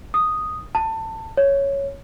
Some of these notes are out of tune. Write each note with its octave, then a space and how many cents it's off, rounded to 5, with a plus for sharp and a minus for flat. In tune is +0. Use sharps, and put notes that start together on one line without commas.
D#6 -5
A5 +20
C#5 +0